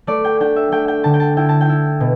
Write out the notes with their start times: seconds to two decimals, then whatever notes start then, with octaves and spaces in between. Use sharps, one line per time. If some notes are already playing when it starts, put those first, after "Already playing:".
0.07 A3 D5
0.24 G5
0.40 D4 G5
0.56 E5
0.72 A3 G5
0.88 G5
1.04 D3 A5
1.14 G5
1.20 A5
1.37 E4 G5
1.49 A5
1.61 G5
1.69 E4
2.00 B2